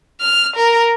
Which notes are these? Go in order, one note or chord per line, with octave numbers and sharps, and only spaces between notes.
F6
A#4